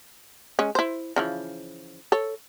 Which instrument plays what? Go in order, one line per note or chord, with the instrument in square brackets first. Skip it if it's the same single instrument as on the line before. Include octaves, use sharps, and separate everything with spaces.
[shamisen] G#3 C#4
E4 C5
C#3 E3 F3
A4 C#5